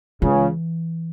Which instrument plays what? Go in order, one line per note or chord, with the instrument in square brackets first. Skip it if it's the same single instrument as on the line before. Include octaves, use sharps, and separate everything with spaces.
[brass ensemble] C#2 C#3 [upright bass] E3